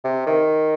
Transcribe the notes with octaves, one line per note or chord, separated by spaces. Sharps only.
C3
D#3